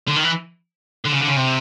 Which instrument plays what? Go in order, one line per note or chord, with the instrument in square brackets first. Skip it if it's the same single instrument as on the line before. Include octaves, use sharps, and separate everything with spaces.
[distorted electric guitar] D3
D#3
E3
D3
C#3
D3
C#3
C3